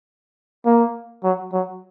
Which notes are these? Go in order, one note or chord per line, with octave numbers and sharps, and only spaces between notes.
A#3
F#3
F#3